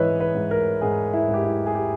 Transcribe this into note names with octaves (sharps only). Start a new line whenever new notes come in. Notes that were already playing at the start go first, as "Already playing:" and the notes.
Already playing: G#2 E3 G#3 B4 C#5 D#5 E5
B4
G#2
A#4
G#2 G#4
E4
G#2
G4
E4
G#4
G4